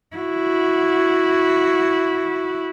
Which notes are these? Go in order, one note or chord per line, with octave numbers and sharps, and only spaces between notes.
E4 F#4